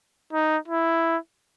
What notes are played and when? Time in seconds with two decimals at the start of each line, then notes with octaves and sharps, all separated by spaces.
0.33 D#4
0.68 E4